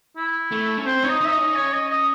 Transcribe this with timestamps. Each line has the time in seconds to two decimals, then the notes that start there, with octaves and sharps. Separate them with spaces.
0.17 E4
0.52 A3
0.78 C#4
0.86 C4 C5
1.04 D#4 C#5
1.09 D#5
1.21 D#4 E5
1.32 D#5
1.38 C#4
1.55 C#5
1.73 D#5
1.90 D#5